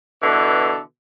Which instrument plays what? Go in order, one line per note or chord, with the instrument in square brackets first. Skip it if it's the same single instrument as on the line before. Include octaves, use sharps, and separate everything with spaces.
[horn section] B2 D3 E3 A4